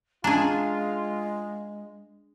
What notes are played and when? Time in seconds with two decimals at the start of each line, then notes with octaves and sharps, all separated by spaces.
0.24 G#3 C#4 D4 F4 G#4 A5 A#5